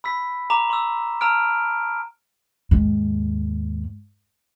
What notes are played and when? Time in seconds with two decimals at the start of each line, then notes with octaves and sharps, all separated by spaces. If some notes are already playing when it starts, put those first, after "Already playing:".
0.04 B5 E6 B6
0.50 A#5 D6 E7
0.70 C6 D6 E6
1.21 A5 A#5 E6 F6 D7
2.71 D#2 G#2